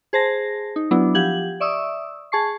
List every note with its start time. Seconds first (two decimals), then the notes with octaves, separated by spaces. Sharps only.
0.13 G#4 C5 A5 A#6
0.76 D#4
0.91 F#3 B3 D4 E4
1.15 F3 G4 F#5 G#6 F#7
1.60 D5 E5 C#6 D#6 E6
2.32 G#4 A5 C#6 C7